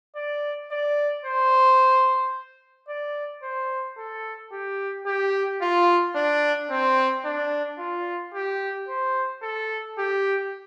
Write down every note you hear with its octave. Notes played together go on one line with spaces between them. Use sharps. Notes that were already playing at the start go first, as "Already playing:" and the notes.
D5
D5
C5
D5
C5
A4
G4
G4
F4
D4
C4
D4
F4
G4
C5
A4
G4